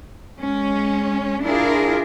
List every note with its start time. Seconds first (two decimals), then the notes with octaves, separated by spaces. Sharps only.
0.41 G#3 C#4
1.44 D4 E4 F4 G#4 A#4